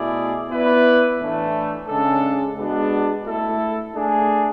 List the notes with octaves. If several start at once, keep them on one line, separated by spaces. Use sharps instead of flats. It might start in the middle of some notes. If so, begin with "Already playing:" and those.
Already playing: B2 A3 E4 G#4 D5
B3 E4 B4 D5
A2 E3 A3 D4
C#3 G#3 D4 A4
G#3 B3 D4 F#4
A3 E4 A4
A3 D4 G#4